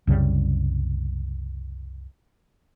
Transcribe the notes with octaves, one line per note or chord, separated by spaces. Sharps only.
C2 F#2 C#3 G3